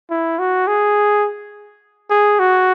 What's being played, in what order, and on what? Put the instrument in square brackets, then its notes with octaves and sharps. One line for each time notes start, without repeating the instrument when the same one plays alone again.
[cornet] E4
F#4
G#4
G#4
F#4